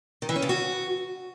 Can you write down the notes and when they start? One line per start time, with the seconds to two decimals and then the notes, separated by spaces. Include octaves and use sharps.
0.22 D#3
0.29 E3
0.36 C#4
0.42 C#3
0.49 F#4